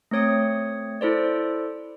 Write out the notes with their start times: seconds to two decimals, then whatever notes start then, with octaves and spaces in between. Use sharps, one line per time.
0.11 A3 C4 C#5 D#6 C#7
1.01 E4 A4 C5 D5